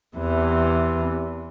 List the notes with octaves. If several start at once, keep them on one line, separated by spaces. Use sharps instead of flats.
E2 C3 E3